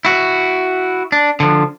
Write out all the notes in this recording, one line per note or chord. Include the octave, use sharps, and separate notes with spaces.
E4 F#4
D4
D3 F3